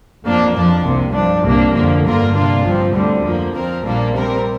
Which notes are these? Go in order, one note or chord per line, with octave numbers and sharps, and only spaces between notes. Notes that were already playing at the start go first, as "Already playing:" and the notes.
F2 F3 A#3 D4
F2 F3 D4
C2 C3 A#3
G2 F3 D4
C2 C3 A#3 D4
F2 D3 F3 A#3
G2 D3 A#3 F4 A#4
C3 A#3 D4 F4
G1 G2 F3 C4
D2 D3 G3 C4
F2 F3 A#3
F2 F3 C4 A#4
A#1 A#2 G3 A#3 D4
C3 G3 C4 A#4